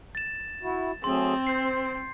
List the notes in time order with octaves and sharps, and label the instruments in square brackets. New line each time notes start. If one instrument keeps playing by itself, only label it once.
[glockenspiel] A6 E7
[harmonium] E4 F#4
[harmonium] F#3 A3 G#4 [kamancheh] C4 [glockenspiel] C6
[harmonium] C5 [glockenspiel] G6 C7